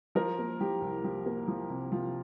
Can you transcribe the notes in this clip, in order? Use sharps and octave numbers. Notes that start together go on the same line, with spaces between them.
F3 A#4
A#3
F3 G4
C2
F3 G4
A#3
F3
C3
F3 F4